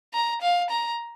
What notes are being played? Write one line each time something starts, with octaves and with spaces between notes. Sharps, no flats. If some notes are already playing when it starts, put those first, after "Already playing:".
A#5
F5
A#5